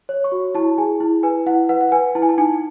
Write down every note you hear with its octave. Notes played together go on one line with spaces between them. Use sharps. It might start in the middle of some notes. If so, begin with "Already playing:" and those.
C#5
C#6
F#4
E4 A5
G#4 G#5
E4
B4 G#5
E4 F#5
B4 F#5
F#5
B4 G#5
E4 A5
G#5
A5
D#4 G#5